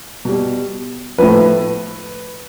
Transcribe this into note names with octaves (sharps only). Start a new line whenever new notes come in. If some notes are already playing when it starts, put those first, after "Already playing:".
B2 G3
A2 F3 B4